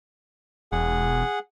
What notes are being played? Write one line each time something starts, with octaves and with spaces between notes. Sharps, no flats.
E1 G#4 F#5